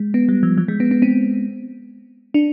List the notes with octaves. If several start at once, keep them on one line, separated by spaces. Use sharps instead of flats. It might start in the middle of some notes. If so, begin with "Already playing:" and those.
Already playing: G#3
B3
G3
F3
F3
G#3
B3
B3
C4
D4